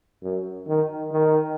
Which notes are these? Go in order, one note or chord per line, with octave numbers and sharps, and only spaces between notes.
F#2
D#3
D#3